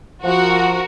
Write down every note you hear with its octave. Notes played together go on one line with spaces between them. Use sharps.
F3 F#4 A#4